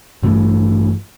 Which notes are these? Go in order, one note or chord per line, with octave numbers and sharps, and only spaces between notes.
A1 G2 E3 A3